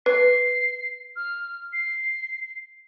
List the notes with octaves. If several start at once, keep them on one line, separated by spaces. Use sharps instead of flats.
B4 C7
F6
C7